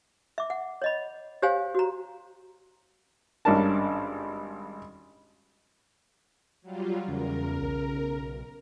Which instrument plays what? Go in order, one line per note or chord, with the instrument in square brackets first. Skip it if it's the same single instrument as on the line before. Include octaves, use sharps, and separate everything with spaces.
[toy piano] E5 D6
F#5
C#5 D#5 B5
G4 C5 C#5 F5 G#5
F#4 A#5
[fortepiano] G#1 G2 C#4 D4 A#4 A5
[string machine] F#3 G3 F4
[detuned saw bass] E2 [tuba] C#3 [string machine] A#4
[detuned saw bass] B1